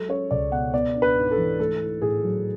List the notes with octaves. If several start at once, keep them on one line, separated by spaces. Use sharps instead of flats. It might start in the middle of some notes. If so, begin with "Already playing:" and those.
Already playing: F#3 G#3 A4
C#4 C#5
C#2 D5
B2 F#5
B3 D5
D4
B4
G#2
A4
E3
A3 A4
E4
A2 G#4
F#3